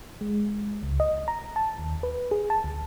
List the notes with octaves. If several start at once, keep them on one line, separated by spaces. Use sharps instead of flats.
G#3
C#2
D#5
A#5
A5
D#2
B4
G#4
A5
D2